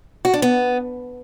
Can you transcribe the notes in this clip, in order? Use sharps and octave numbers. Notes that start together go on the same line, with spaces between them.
F#4
D4
B3